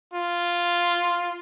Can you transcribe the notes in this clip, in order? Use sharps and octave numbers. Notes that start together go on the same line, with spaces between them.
F4